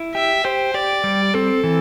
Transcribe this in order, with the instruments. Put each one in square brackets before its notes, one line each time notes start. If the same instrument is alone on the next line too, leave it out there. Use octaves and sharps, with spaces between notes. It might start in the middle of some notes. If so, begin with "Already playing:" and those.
Already playing: [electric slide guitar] E4
[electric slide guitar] G4 [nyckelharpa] E5
[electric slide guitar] G4 [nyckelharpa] C5
[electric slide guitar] G4 [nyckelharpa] D5
[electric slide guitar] G3
[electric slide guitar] C4 [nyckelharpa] A4
[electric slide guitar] E3